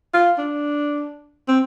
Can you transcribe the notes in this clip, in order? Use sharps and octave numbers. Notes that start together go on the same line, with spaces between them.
F4
D4
C4